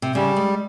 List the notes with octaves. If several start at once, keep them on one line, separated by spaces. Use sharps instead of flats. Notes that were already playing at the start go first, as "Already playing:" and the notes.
C3
C#3 G3
G#3